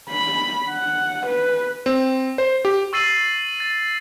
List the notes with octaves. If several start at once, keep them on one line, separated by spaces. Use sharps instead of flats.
B5
F#5
B4
C4
C5
G4
C#6 E6 A6 C7 D#7 F#7
A6